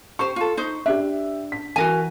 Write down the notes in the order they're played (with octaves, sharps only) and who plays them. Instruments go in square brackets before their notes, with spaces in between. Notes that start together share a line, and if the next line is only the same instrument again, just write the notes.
[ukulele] G4 C5 [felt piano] C#6
[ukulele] F4 A4
D#4 C5
[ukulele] D4 [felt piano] G4 E5
[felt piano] B6
[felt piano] E3 [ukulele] F#4 A#4 G#5